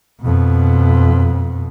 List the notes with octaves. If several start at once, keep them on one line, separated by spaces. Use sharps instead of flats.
F2 B2